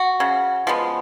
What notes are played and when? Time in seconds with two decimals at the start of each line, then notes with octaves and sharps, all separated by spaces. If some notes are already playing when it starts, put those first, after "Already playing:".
Already playing: F#4
0.20 C#3
0.67 F3 G#3 B3